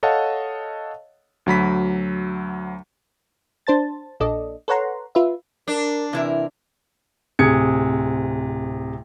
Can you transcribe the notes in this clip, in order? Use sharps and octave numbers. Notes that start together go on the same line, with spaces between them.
A4 C#5 D#5 F5 F#5 A5
D2 F#3 B5 B6
D4 C5 A5 A6
A#1 A#2 D4 A4 D5 D#5
A4 B4 C#5 F#5 A#5 C6
F4 B4 E5
D4 A#4
C3 E3 E4 A#4
D1 C3 G#4 G#6 C#7